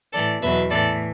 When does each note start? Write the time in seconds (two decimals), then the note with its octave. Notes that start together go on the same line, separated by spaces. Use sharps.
0.13 A2 E3 A4 D5
0.42 E2 B2 F#3 B4 E5
0.71 A2 E3 A4 D5